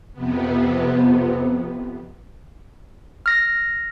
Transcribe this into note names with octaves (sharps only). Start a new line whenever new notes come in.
F2 C3 B3
F6 A#6